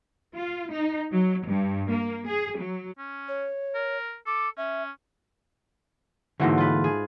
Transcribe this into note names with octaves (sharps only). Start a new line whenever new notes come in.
F4
D#4
F#3
G2
A#3
G#4
F#3
C#4
C#5
A#4
A4 D6
C#4 E5
G#2 D3 E3 F#3 A3 A#3
F4 B4
G#4